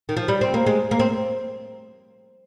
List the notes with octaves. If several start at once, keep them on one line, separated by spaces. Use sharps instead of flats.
D#3
F3
G3
C4
A#3
G#3
A#3
C4